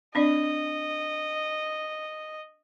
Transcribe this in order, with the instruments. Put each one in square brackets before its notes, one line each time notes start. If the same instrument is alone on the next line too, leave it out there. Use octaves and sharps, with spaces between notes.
[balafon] C4 D4 D5 [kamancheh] D#5